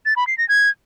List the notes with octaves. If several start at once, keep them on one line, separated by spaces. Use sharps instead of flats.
A6
B5
C7
A#6
G#6